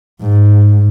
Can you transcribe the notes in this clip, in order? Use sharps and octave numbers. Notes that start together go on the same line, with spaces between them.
G#2